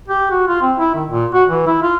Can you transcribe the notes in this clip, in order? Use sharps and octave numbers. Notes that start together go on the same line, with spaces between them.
G4
F#4
F4
C4
E4
D#3
A#2
F#4
E3
E4
F4